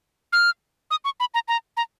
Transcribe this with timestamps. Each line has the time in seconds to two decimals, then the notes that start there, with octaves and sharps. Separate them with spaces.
0.33 F6
0.91 D#6
1.05 C#6
1.20 B5
1.34 A#5
1.48 A#5
1.77 A#5